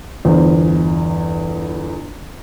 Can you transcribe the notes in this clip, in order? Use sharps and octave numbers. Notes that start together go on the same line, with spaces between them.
G1 E2 C5